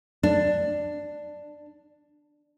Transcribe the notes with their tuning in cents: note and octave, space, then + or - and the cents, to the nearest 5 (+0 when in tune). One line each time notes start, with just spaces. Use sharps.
D4 +10